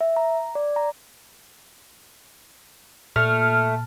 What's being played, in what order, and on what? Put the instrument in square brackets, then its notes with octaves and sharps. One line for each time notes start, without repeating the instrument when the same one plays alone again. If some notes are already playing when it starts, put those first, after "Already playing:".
[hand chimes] E5
A#5
D5
A#5
[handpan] A#2 [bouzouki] A3 [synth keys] F6